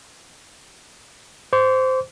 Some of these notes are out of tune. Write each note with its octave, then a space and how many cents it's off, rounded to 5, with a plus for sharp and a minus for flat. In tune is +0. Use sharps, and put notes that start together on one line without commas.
C5 -10 D6 -45